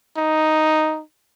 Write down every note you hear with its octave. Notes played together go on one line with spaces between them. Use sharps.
D#4